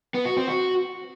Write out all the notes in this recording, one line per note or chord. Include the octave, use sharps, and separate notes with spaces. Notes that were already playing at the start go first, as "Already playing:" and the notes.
B3
F#4
C4
F#4